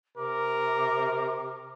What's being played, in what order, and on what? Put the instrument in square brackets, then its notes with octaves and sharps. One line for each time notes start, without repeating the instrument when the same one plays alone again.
[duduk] C3 [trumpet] A#4 [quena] D6